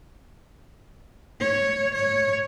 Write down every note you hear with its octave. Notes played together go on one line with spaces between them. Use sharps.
C#5
C#5